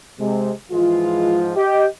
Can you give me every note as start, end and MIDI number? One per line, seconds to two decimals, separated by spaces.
0.19 0.51 48
0.19 0.51 56
0.72 1.51 44
0.72 1.51 52
0.72 1.51 53
0.72 1.51 56
0.72 1.51 65
1.56 1.85 67
1.56 1.85 75